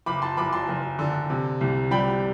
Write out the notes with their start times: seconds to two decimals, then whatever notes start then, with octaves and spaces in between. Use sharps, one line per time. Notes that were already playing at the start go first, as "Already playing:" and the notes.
0.06 F#1 B5 D6
0.22 A5 C6
0.37 F#1 B5 D6
0.53 A5 C6
0.68 F#1
0.99 D3
1.30 C3
1.61 C2
1.91 G3 G5 B5